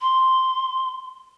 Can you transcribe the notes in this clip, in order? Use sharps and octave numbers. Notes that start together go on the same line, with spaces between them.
C6